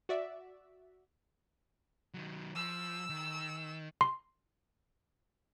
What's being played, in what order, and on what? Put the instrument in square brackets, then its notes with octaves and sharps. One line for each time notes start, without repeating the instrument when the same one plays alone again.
[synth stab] F#4 D5 E5
[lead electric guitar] D#3 F#3
[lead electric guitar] F3 [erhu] E6
[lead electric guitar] D#3
[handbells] C6